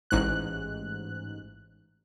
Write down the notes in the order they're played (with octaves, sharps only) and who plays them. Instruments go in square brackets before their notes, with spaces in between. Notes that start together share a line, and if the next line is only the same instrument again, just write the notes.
[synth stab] A1 G#2 F#6